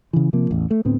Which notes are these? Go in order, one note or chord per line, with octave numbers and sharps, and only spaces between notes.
C#3 E3
C3 F3 A#3
A1 E2
A3
D2 A2 B3 C4